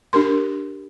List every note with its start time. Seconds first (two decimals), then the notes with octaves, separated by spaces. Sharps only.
0.13 D4 G4 A#4 C6